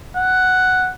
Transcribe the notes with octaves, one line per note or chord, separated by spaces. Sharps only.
F#5